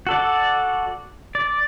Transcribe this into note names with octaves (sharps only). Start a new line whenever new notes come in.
F#4 A4 D5
D5